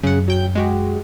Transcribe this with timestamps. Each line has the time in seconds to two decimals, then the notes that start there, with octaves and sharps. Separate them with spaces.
0.03 F#2 C#3 F#5
0.28 F#3 G5 G6
0.55 G#3 F#4 G4